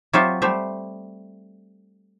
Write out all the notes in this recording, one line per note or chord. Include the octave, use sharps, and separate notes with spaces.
F#3 C4 F4 G4 C5 E5
G3 A3 C5 E5